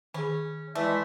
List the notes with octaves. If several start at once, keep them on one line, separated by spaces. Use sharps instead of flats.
D#3 C#4 G#4
E3 G#3 A3 D5 E5